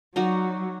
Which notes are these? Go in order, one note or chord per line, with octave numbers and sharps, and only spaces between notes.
F#3 D#4 F#4 D5